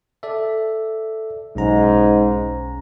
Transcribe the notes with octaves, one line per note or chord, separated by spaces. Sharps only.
A4 D5 E5
B1 G#2 C#4 A#5